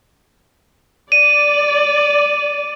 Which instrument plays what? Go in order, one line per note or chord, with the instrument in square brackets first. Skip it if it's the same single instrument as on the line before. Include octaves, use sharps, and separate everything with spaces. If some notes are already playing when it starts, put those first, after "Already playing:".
[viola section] D5 [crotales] D#7